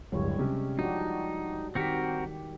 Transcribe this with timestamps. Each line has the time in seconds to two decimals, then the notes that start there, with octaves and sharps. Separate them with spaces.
0.12 D1 G1 G3 G#3 C#5
0.39 C3 C#4
0.79 F3 D4 D#4 F#4 G4
1.75 D#3 C4 F#4 G4 A#4 B6 C#7